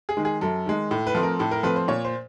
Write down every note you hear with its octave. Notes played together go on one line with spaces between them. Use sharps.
G#4
D#3 G#3
G#4
F#2 A4
D#3 G#3
A2
B4
F3 A3 C4
A#4
A2 A4
A#4
F3 A3 C4 B4
C5
A#2 C#5
C5